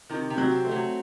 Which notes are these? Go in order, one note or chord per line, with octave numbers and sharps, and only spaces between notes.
C3 D#3
C3
F#3
C4
A3
F#3